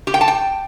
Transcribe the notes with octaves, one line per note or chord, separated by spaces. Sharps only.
G4
G5
A5
G5